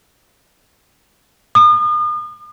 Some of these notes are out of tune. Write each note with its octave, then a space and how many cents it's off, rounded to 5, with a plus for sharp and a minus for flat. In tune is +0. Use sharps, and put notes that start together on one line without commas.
D#6 -40